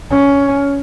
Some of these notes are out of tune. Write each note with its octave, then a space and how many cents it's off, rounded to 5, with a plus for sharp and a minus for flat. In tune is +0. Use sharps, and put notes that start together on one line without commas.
C#4 +10